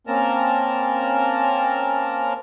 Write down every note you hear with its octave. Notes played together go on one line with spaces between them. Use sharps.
A#3 C4 C#4 A#4 A5 A#5